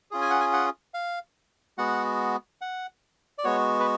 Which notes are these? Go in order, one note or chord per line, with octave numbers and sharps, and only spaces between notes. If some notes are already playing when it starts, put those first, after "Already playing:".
C#4 F4 G#4
G#5
F#5
G#5
F#5
F5
G#3 B3 F#4 F#5
F#5
D5
G#3 B3 F#4 C#5
B4